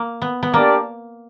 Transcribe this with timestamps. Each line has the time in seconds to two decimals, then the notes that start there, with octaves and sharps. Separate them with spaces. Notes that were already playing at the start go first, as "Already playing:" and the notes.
Already playing: A#3
0.22 B3
0.43 B3
0.54 A#3 D4 G4 A#4 D5